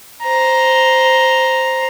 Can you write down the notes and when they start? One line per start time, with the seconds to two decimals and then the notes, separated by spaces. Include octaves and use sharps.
0.24 C5 A#5